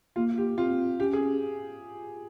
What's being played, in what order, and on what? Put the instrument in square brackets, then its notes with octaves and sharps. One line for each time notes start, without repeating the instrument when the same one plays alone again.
[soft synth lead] A#3 [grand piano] F4
[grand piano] G4
[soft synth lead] C4 [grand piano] F4
[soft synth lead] C#4 [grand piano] G4
[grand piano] G#4